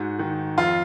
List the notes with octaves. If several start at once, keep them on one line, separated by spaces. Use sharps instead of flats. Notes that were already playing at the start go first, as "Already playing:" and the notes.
Already playing: G#2 F#4
D#3
F2 F4